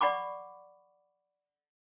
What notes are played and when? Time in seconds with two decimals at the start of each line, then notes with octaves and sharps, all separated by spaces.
0.01 D5 F#5 B5 C#6 D6